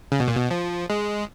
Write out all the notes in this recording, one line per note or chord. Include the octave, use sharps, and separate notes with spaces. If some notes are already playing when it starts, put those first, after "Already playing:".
C#3
B2
A#2
B2
F3
G#3